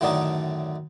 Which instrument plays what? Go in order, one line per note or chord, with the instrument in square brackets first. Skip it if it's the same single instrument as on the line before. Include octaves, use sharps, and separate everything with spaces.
[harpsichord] F#2 A2 D3 D#3 D4 D#4